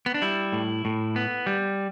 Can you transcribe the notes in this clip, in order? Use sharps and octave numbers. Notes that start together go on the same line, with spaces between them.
B3
D4
G3 E4
A2
A2
B3
G3